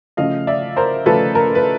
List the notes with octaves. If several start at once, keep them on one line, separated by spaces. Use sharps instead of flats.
C#3 F3 A3 C#4 F4 D#5 F5
D5 E5
A#4 C5
C#3 F3 A3 C#4 F4 A4 B4
A#4
B4